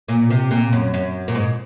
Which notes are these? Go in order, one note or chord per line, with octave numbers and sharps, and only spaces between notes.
A#2
C3
A#2
F#2
F#2
A#2
G#2